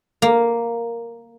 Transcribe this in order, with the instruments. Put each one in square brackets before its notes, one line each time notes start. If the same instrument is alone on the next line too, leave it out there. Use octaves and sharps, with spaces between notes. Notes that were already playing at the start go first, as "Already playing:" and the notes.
[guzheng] A#3